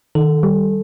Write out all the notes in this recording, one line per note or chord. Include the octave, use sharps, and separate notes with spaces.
D#3 A4
G3